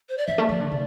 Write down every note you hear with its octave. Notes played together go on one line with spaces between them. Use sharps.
C5
D5
F3 E5
A3
F3 D5
D3
C3